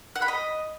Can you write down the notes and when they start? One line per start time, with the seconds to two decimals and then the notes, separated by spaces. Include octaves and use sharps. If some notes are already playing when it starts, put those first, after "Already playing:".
0.16 F#5
0.22 B5
0.28 D#5